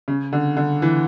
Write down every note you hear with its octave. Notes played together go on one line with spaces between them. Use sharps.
C#3
D3
D3
E3